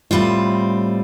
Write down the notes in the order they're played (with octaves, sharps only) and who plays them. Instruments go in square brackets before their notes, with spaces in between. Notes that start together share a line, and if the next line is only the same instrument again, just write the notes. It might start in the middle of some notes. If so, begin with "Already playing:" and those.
[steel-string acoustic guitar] A2 G3 C4 F4